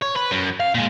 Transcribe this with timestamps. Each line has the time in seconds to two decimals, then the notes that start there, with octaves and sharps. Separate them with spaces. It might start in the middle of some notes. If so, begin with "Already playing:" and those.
0.02 C#5
0.16 B4
0.31 F#2
0.60 F5
0.75 A#2 G#3